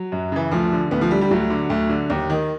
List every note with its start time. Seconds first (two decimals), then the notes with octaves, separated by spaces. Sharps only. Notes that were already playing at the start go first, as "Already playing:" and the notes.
Already playing: F#3
0.12 F#2
0.32 C#3 E3
0.51 D2 F3
0.72 D3
0.91 D2 B3
1.01 F3
1.11 D3 G3
1.21 G3
1.31 D2 F#3
1.50 D3
1.70 D2
1.89 D3
2.10 D#2
2.30 D#3